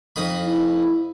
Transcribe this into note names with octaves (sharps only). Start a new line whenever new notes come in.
F2 D#4 B5
E4